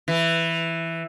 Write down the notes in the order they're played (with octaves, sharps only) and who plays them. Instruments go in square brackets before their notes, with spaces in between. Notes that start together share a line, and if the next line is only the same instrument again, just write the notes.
[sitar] E3